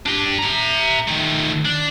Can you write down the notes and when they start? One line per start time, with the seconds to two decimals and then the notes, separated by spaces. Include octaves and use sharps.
0.06 D4 G4
0.38 E5 A#5
1.08 D#3 A3
1.65 D4